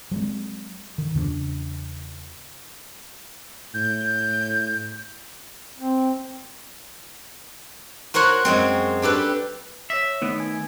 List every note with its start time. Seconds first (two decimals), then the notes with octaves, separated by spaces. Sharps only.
0.11 F#3 G#3 C4
0.98 D#3
1.14 E2 C#3 A3 D4
3.74 A2 G6
5.78 C4
8.14 F#4 A#4 C5 C#5 F#5
8.45 F#2 G#3 C4
9.02 D4 G4 A4 B4
9.90 C#5 E5 D#6 A#6
10.22 D#3 A3 B3 D7
10.40 G#5 G#6